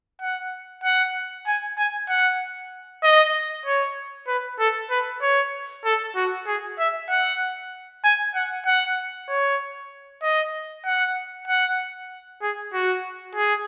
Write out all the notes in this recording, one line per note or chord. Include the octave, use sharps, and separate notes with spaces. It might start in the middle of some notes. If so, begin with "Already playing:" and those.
F#5
F#5
G#5
G#5
F#5
D#5
C#5
B4
A4
B4
C#5
A4
F#4
G#4
E5
F#5
G#5
F#5
F#5
C#5
D#5
F#5
F#5
G#4
F#4
G#4